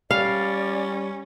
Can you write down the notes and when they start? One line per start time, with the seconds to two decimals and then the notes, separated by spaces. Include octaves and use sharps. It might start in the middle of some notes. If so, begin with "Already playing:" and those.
0.11 G3 C#4 D5 F5